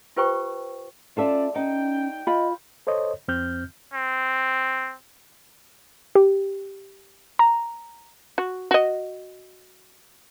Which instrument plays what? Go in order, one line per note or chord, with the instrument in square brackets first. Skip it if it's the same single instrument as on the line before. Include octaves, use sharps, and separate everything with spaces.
[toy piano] F4 G4 B4 C5 G5 C#6
[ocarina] C#4 [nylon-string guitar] F4 A4 E5 [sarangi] D5
[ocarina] C#4 [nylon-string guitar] D#4 [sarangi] G5
[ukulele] F4 B5 [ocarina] D#5
[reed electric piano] A4 C5 C#5 D#5
F2 C4 F6 G6
[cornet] C4
[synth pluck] G4
A#5
[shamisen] F#4
F#4 D#5